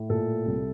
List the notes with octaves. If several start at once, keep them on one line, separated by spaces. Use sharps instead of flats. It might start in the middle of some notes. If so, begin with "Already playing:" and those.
Already playing: A2
A#2 A4
C2